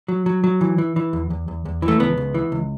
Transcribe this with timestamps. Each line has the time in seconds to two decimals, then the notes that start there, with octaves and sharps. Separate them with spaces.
0.08 F#3
0.26 F#3
0.44 F#3
0.61 E3
0.78 E3
0.96 E3
1.13 E2
1.30 E2
1.48 E2
1.65 E2
1.82 E3
1.88 A3
2.00 C#2 B3
2.17 C#2
2.34 E3
2.52 C#2